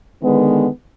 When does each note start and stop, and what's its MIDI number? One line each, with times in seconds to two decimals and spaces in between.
0.22 0.67 50
0.22 0.67 51
0.22 0.67 56
0.22 0.67 59